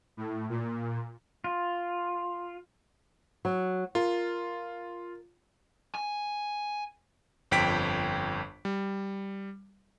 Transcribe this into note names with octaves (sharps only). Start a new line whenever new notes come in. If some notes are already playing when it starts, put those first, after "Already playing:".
A2
A#2
F4
F#3
F4 A#4
G#5
G1 F2 G5 B6 D7
G3